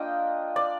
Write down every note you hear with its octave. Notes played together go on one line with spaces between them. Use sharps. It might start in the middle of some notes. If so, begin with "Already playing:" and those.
Already playing: A#3 D4 F4 D#5 G5
D5